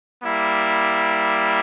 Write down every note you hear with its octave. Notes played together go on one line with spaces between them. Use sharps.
G3 A#3 E4